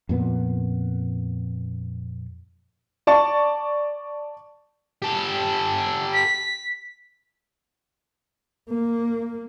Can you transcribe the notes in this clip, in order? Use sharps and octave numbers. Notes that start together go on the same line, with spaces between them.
F2 A#2 B3
D5 A5 C#6
G4 A4
B6
A#3